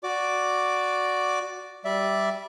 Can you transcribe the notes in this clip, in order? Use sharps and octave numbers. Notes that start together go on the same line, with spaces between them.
F#4 D5 D6
G3 D5 E5